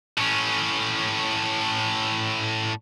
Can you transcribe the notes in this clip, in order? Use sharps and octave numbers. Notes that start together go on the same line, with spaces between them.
A2 C#4